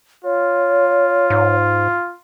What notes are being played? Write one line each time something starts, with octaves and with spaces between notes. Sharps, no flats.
F4 C#5
G#2